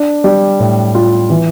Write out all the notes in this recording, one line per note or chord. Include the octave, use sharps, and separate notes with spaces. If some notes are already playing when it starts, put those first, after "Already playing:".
Already playing: D4
G3
A2
F4
E3